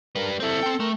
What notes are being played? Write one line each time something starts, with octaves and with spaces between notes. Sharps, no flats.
G3 A#4 B4
C4 E4 A4
C4 G5
A3 A#4